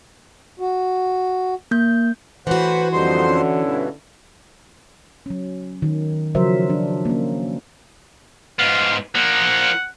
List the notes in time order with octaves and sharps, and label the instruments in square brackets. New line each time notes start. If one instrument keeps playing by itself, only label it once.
[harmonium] F#4
[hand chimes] A#3 G6
[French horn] A2 [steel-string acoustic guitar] E3 F#4 [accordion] B4 C5 F#5
[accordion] F2 C5 C6 [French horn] D3 [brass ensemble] G3 D#4
[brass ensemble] C#4 E4
[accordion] G2 B2
[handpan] F#3 C#4
D#3 F#3
C#3 F3 F#3 A#4 C5 E5
D4
A#3 C#4
[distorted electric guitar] G#2 B3 [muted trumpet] F5
[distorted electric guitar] F3 A#3 [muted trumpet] F#5